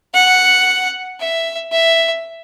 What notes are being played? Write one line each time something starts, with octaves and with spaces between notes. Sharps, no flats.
F#5
E5
E5